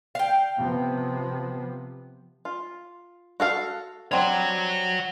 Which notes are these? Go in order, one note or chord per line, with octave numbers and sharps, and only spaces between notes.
F5 G5
C3 F3 B3
F4
F#4 A4 F5
G3 C4 D4 C#5 F#5